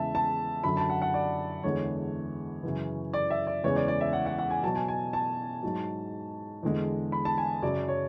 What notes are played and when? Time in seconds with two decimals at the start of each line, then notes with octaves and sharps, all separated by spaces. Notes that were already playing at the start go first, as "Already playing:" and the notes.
Already playing: E2 C#3 G#3 E5 A5
0.15 A5
0.64 F#2 D3 F#3 B5
0.77 A5
0.90 F#5
1.02 F#5
1.14 D5
1.63 E2 D3 G#3 C#5
2.63 F#2 C#3 E3
3.14 D5
3.30 E5
3.47 D5
3.64 E2 C#3 E3 G#3 C#5
3.76 D5
3.88 D5
4.01 E5
4.13 F#5
4.26 F#5
4.38 F#5
4.50 G#5
4.63 B2 F#3 A5
4.75 G#5
4.88 G#5
5.13 A5
5.63 G#2 F#3
6.63 E2 D3 G#3
7.12 B5
7.25 A5
7.38 G#5
7.63 F#2 C#3 F#3 D5
7.88 C#5